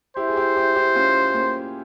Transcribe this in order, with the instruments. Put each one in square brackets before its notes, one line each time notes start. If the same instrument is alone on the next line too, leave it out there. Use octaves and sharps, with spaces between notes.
[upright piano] E4 G4 [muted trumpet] C5
[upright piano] G#4
E4 G4
E4 G4
E4 G4
C#4 F4
A#3 C#4